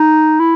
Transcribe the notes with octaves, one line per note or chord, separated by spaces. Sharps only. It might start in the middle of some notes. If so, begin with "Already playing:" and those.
Already playing: D#4
E4